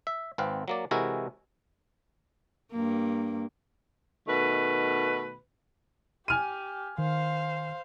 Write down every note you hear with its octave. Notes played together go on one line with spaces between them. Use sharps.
E5
G#1 C4 B4 F5
F#3 A#3 D5
C3 E3 G#3 E4 F#4 A#4
G2 A#3
B2 D#3 A3 B4
G4 G#5 F6 D#7
D#3 C5 F5